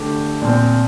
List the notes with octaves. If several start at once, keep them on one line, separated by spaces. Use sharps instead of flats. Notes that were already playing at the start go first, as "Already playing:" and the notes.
Already playing: D3 A3 G4
A#2 F3 C4